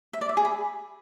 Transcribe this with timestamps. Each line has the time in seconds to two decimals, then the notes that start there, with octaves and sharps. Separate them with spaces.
0.13 E5
0.21 D5
0.29 E5
0.37 G#4
0.45 B5